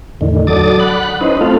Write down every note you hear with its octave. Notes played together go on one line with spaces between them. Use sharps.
E2 A2 D3 D#3
F#3 A4 D5 D6 D#6 A6
F#5 B5 F#6
C#4 D#4 E4 B4 C5 D#5
A3 C4 F4 A4 F5